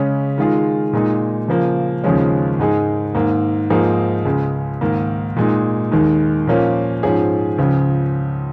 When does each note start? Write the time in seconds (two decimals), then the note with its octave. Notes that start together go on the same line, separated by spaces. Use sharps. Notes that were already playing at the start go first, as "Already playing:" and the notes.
Already playing: C#3 G#3 C#4
0.38 D#3 G#3 F4 G#4
0.93 A#2 G#3 D#4
1.48 C#3 F3 A#3
2.04 D#2 C#3 F3 G#3 C#4
2.59 G#2 G#3 D#4 G#4
3.15 G#2 D#3 A#3
3.70 G#2 F3 A#3 D#4 G#4
4.25 C#2 C#3 G#3
4.81 G#2 D#3 A#3
5.36 A#2 G#3 D#4
5.91 D#2 D#3 G#3
6.47 A#2 F3 A#3 C#4
7.03 G#2 F3 C#4 G#4
7.58 C#2 C#3 F3